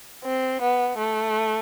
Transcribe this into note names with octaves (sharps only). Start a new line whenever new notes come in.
C4
B3
A3